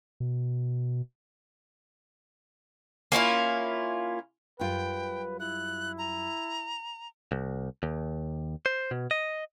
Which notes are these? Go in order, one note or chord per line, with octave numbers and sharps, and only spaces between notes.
B2
A#3 C#4 E4 F4
F#2 G3 F4 B4 G5
E4 F#6
A#5
C2
D#2
C5
B2
D#5